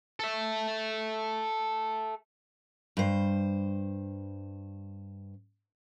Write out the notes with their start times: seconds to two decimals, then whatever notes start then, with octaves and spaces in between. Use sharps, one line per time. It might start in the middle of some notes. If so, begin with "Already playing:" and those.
0.20 A4 E5
2.97 G2 C5